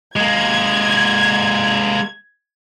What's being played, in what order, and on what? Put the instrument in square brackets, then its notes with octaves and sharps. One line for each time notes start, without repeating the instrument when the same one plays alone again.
[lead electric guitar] G#3 A#3 [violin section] G#6